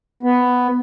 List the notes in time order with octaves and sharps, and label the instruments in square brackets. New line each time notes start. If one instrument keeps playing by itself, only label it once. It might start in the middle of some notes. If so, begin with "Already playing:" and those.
[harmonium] B3